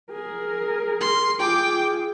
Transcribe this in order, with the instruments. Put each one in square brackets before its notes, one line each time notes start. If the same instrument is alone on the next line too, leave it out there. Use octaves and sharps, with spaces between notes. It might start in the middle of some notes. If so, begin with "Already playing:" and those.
[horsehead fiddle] G#4 A#4
[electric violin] C6
[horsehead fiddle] F4 G#4 [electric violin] G5 D6